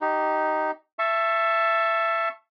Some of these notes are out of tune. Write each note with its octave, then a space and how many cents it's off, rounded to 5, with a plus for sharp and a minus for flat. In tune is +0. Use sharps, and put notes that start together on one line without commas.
D#4 +0 G4 -20
E5 +20 A5 +0 C#6 -15